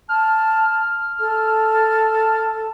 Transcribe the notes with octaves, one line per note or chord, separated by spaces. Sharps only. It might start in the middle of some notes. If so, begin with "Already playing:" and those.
A5 F6
A4